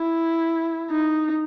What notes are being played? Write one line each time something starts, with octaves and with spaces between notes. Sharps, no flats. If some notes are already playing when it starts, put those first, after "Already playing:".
Already playing: E4
D#4